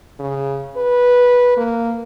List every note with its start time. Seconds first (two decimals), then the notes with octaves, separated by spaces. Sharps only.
0.20 C#3
0.77 B4
1.57 A#3